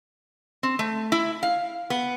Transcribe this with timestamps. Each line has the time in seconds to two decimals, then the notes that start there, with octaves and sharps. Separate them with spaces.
0.63 C4
0.79 A3
1.12 E4
1.43 F5
1.90 B3